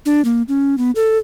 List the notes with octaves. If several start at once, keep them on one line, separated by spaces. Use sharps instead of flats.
D4
A#3
C#4
B3
A4